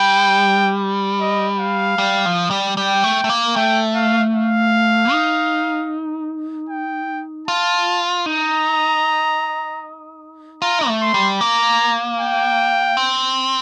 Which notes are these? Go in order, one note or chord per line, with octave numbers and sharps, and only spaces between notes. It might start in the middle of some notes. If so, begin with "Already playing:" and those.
Already playing: G3 G5
D#5
F5
G3
F3
G3
G3 G5
A3
A3
A#3
A3 G5
F5
F5
D#4
G5
F4 A5
D#4 A#5
F4 A#5
A3
C6
G3
A#3 A#5
G5
C4